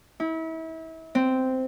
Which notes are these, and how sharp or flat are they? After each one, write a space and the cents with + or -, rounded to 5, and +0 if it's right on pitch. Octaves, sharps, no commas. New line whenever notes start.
E4 -35
C4 -10